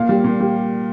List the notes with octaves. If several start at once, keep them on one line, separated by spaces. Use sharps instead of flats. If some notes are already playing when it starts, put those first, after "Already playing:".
Already playing: A#2 F5
G3
A#2
G3